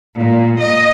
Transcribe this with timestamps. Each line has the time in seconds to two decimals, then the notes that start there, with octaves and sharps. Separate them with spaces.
0.18 A#2
0.59 D#5